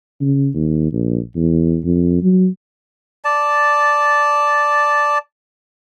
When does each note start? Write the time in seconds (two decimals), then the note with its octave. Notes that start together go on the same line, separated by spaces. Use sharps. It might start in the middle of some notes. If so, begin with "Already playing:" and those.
0.21 C#3
0.54 D#2
0.93 A#1
1.35 E2
1.84 F2
2.22 F#3
3.25 D5 A5